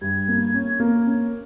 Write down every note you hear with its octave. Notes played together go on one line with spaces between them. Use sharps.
G2 G#6
A#3
C#4
A#3
C#4